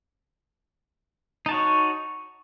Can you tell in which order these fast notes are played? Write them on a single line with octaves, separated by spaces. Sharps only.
D#4 A5 F#4 C#5